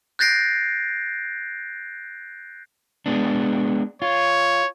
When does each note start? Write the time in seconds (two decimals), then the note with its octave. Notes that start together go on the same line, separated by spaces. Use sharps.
0.19 F#6 G6 A6 A#6 C7 D7
3.06 G#3 B3 D4
4.02 F4 C#5